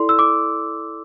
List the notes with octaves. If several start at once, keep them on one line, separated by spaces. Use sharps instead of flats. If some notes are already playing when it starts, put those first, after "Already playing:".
Already playing: E4 A4 D5 C6
E6
D6